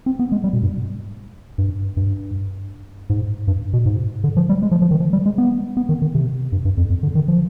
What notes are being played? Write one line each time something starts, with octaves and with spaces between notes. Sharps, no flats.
C4
B3
G#3
G3
B2
G2
G2
G2
G#2
G2
B2
G#2
D3
F3
G3
G#3
F3
F3
D#3
F3
G3
G#3
B3
B3
D#3
D#3
C3
G2
G2
F2
F2
D3
D#3
F3